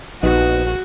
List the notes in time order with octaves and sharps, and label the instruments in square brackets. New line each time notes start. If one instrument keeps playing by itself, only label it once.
[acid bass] A#1 [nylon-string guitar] B3 D#4 [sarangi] F#4